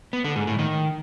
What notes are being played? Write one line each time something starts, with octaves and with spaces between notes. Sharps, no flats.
B3
D3
G#2
A2
D#3